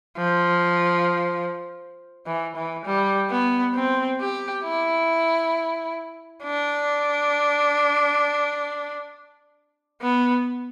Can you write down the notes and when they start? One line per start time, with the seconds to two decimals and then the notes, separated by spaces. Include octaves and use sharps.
0.17 F3
2.26 E3
2.56 E3
2.86 G3
3.30 B3
3.75 C4
4.20 G4
4.64 E4
6.44 D4
10.02 B3